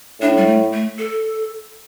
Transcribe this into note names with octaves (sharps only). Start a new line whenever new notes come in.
A2 D4
G3
A3
A3
A4